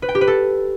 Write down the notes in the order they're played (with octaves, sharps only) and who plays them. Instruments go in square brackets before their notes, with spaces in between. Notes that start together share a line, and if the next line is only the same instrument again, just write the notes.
[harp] B4
G5
G4
B4
A4